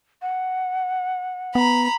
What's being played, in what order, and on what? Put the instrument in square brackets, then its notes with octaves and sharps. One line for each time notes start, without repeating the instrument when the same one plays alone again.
[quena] F#5
[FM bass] B3 [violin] A#5 B5